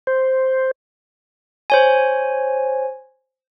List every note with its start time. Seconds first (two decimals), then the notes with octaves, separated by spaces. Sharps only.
0.07 C5
1.70 C5 C#5 G#5